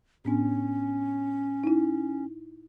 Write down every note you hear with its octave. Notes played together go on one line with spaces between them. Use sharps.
A2 B3 C#4 D4
D#4 E4